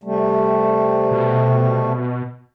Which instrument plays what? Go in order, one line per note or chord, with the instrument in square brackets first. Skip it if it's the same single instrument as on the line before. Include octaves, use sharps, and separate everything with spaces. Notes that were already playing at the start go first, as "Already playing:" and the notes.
[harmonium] C3 G3 A3
[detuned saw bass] B2